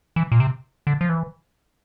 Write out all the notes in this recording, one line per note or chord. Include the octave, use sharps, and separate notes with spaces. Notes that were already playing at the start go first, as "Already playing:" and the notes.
E3
A#2
C3
D3
F3
E3